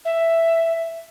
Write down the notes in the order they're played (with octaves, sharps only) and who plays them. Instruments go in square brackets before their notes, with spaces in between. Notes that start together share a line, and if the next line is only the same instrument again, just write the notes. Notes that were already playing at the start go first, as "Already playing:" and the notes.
[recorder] E5